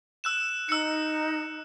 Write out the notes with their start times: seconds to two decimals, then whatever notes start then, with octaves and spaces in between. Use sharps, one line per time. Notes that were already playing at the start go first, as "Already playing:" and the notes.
0.24 E6 F#6 E7
0.69 D#4 E6 C#7